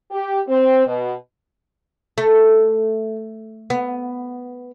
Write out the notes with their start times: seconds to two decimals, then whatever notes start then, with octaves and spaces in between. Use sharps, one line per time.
0.11 G4
0.48 C4
0.86 B2
2.18 A3
3.70 B3